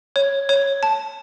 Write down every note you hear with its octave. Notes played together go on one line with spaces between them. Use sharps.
C#5
C#5
A5